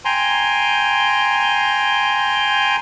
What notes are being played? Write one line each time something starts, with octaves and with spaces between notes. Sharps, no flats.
G5 G#5 A#5 C6